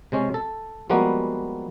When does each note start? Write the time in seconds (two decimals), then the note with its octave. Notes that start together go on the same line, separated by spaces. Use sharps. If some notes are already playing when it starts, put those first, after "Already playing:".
0.12 C3 G#3 C#4
0.34 A4
0.90 F3 G3 G#3 A#3 B3 F#4